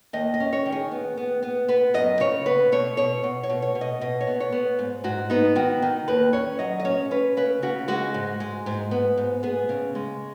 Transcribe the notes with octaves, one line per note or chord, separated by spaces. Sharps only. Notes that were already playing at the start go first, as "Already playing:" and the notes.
D#2 D#5
D#5
C#4
C#5
D#3
G#4
B3
B3
B3
B3 B4
F#2 D#5
C#3 C#5
B3 B4
B2 C#5
B2 C#5
B2
C#5
B2
C#5
B2
D#5
B2 D#5
C#5
B3
C#5
B3
G#2
G#2 F#4
B3 D#4
D#3 F#4
D#3
D#2 B4
C#4 C#5
F#3 D#5
D#5
C#4 C#5
C#4 B4
C#3 B4
C#3 F#4
G#3 F#4
G#2
G#3
G#2
B3
G#2
B3 G#4
C#3
G#3